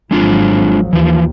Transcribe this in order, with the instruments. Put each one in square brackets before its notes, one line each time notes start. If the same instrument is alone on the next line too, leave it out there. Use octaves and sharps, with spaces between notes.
[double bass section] G#1 F3 F#3 [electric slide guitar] G#3 D4 F4
[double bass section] D#2 [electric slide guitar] E3 F3